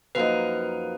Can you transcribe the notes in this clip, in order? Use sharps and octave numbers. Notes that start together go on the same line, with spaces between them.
F#2 F3 A#3 D#4 B4